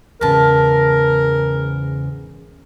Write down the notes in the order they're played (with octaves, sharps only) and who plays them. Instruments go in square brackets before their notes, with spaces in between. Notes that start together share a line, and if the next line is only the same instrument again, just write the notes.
[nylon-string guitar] E2 G#2 C#3 [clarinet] A#4 [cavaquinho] B4 A5